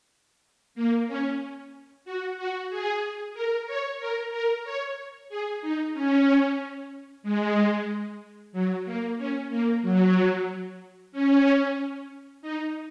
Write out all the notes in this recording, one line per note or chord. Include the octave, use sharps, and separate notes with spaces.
A#3
C#4
F#4
F#4
G#4
A#4
C#5
A#4
A#4
C#5
G#4
D#4
C#4
G#3
F#3
A#3
C#4
A#3
F#3
C#4
D#4